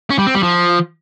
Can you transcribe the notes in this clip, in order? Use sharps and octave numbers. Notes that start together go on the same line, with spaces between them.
C#4
G3
C4
G3
F3